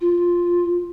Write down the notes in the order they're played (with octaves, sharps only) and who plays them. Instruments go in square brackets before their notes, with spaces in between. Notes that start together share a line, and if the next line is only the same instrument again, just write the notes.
[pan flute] F4